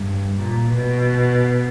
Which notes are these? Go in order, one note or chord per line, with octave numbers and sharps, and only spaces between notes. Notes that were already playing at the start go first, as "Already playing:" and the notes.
Already playing: G2
A#2
B2